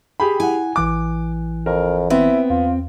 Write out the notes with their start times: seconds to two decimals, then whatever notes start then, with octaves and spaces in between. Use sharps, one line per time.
0.20 G4 G#4 G5 B5
0.40 E4 F#5 G#5
0.76 A1 E3 D6 F#6
1.66 F2 A#4
2.10 B3 C4 E4
2.50 E2 F4